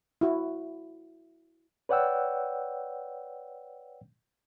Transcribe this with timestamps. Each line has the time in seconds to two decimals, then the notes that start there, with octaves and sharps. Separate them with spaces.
0.21 E4 F#4
1.89 B4 C#5 D5 F#5 G5 E6